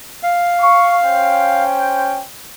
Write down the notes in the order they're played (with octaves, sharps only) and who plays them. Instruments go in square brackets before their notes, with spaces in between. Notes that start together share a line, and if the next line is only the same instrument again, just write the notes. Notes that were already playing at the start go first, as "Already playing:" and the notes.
[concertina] F5
[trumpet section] C#6
C#4 C5 G5